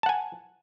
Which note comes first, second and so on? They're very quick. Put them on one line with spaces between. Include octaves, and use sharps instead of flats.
A5 F#5 G#5